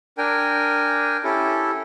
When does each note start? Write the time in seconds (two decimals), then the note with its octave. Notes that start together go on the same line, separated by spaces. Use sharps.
0.18 D4 A#4 G5 G#5
1.24 C#4 E4 G4 A4